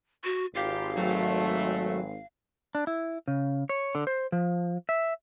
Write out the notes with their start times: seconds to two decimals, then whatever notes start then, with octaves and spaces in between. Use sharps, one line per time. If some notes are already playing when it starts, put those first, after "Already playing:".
0.24 F#4
0.55 G#1 F4 G4 F5
0.97 F#3 A3
2.75 D4
2.87 E4
3.28 C#3
3.69 C#5
3.95 D3
4.07 C5
4.32 F3
4.89 E5